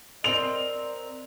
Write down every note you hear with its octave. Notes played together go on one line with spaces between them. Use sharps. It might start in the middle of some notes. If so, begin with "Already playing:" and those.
C4 A#4 D5 D#5 F7